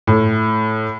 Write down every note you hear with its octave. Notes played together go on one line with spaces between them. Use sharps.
A2